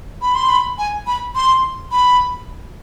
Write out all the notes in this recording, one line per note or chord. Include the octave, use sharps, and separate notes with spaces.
B5
C6
B5
G#5
B5
C6
B5